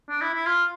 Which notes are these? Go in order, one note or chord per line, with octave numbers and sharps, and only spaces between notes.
D4
E4
E4
F4